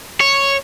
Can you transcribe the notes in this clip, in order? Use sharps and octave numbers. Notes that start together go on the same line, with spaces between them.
C#5